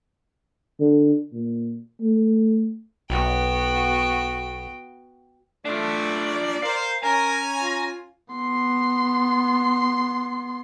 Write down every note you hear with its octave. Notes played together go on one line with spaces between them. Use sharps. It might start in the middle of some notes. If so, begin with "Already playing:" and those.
D3
A#2
A3
B1 B3 F#4 G5
A3 D4 F4 D5
A#4 C5 F5
C#4 A#4 G#5 A#5
F4
B3 C6